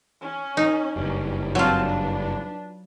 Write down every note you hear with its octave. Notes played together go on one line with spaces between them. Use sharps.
C#4
D#4
F#1 G2 C#4
F#3 C4 F4 A5
D4 B4